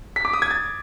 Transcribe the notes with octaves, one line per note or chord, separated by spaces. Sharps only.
B6
D6
D#6
G#6
A6